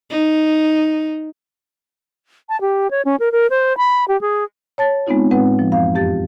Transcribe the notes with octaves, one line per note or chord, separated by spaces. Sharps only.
D#4
A5
G4
C#5
C#4
A#4
A#4
C5
B5
G4
G#4
C#5 A5 A6
G#3 B3 C4 D#4 F4
A2 G#3 C4 B4 F#5
F3
F#2 E3 F5
F2 G4 A6